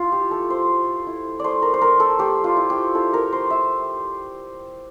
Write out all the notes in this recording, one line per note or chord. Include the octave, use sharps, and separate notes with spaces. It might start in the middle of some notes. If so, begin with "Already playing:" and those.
Already playing: E4 F4
G4
A3 A4
C5
A3
E4
A3 C5 D5
A#4
C5
A3 A#4
A4
A3 G4
F4
E4
G4
E4 A4
A#4
A3 C5
E5